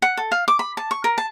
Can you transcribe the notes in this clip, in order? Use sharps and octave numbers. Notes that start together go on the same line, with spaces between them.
F#5
A4
F5
D6
B5
A5
C#6
A#4
A5